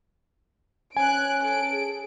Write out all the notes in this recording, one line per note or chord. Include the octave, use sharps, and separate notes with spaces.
C#4 G#5 F#6 D7
A4 D7
G#4